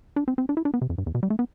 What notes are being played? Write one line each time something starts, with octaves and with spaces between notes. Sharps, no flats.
D4
C4
C4
D4
E4
D4
B3
C3
F2
G2
E2
B2
G3
A3
B3